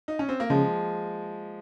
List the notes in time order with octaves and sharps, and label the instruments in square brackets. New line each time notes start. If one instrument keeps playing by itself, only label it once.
[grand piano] D#4
C#4
C4
A#3
[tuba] C#3 [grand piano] F3 G#3